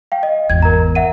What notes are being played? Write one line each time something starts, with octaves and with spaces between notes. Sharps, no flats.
F5 G5
D#5
G#1 E2 G#6
A#4 A#5
E5 F#5 D#7